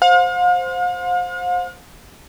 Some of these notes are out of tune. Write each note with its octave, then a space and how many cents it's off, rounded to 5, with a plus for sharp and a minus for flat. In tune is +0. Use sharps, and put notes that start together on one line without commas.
C5 +0 F5 +45